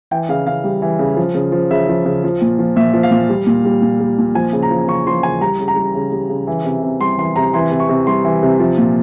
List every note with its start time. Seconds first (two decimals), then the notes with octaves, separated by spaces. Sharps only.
0.11 E3 G5
0.29 C#3 F5
0.47 C#3 F5
0.64 G3
0.82 E3
0.99 C#3
1.17 F3
1.34 C#3
1.52 F3
1.71 C#3 E5
1.89 F3
2.06 C#3
2.24 F3
2.41 A#2
2.59 F3
2.76 A#2 E5
2.94 F3
3.03 F5
3.11 A#2
3.29 G3
3.46 A#2
3.65 G3
3.82 A#2
4.00 G3
4.18 A#2
4.35 F3 G#5
4.53 C#3
4.63 A#5
4.71 F3
4.88 C#3 C#6
5.07 F3 C6
5.23 C#3 G#5
5.41 G3 A#5
5.60 C#3
5.68 A#5
5.76 G3
5.95 C#3
6.12 G3
6.29 C#3
6.47 E3
6.65 C3
6.83 C3
7.00 G3 C6
7.18 E3 C6
7.36 C3 A#5
7.54 E3 C6
7.71 C3
7.80 C#6
7.89 C3
8.07 G3 C6
8.25 E3
8.43 C3
8.60 F3
8.78 A#2